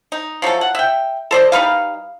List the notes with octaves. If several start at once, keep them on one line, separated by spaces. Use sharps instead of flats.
D#4
F3 F#3 A3 A4
F#5
E5 G5
A4 C5 D5 D#5
G3 D#4 B4 F5